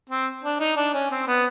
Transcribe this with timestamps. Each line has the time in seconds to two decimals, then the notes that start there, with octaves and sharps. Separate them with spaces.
0.09 C4
0.44 D4
0.60 D#4
0.76 D4
0.94 C#4
1.11 C4
1.27 B3